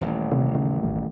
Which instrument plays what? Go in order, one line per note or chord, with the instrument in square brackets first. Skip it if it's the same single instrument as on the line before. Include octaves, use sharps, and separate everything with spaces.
[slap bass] D#1 A1
[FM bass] C3
C#3
G#1